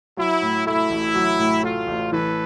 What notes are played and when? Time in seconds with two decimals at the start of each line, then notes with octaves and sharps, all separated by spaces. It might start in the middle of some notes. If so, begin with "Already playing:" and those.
0.17 F#3 E4
0.42 A2
0.66 A3 E4
0.90 A1
1.15 F#3
1.38 A2
1.63 A3 F4
1.88 A1
2.12 E3 A4 B4